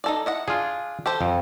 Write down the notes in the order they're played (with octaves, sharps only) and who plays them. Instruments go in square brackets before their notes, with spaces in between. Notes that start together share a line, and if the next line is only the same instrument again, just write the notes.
[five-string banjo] D#4 A4 D5
E4 D#5 F#5
[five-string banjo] D4 [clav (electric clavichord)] F4 G#4
[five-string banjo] G4 A4 C5
[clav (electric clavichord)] F2